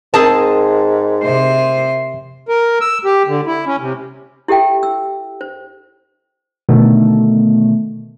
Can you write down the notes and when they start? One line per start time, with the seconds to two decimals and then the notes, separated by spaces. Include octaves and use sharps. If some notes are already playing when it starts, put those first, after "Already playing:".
0.14 G#2 C4 G#4 A#4 A5
1.24 C3 C5
2.48 A#4
2.81 E6
3.05 G4
3.28 D3
3.47 E4
3.67 C#4
3.79 C3
4.48 E4 G4 A4 E5 G5
4.83 E6
5.41 C5
6.69 B2 D3 D#3 A3